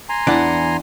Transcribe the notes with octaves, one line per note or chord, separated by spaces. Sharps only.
G#5 A#5 C6
E2 E3 D4 E4 D5 F#5